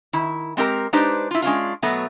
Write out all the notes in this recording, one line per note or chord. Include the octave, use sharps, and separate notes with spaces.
D#3 E4
G#3 C4 G4 A#4 A#5
G#3 D4 D#4 G4 B4 C5
E4 F4
G#3 C#4 D4 F4
B2 F#3 A3 B3 F#4